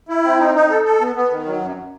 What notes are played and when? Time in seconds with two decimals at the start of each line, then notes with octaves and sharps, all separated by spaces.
0.09 E4
0.24 C4
0.39 D#4
0.55 D#4
0.70 A4
0.85 A4
1.01 B3
1.16 B3
1.31 D#3
1.46 F#3
1.61 F#2